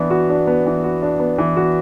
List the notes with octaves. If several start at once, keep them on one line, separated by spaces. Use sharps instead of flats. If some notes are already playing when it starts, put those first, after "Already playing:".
Already playing: E3 B3 D4
F#4
D4
B3
E3
F#4
D4
B3
E3
F#4